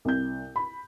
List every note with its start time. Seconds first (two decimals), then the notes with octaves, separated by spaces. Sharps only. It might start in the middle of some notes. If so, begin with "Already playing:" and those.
0.05 C2 G6
0.56 B5